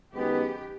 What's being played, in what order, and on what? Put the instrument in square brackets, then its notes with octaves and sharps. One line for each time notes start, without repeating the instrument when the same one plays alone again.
[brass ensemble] F#2 D#3 G#3 B3 [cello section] G4